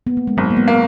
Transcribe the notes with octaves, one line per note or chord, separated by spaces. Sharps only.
B3
A#3
G#3
G#1 F#3
A#3
G#3 B3
A#3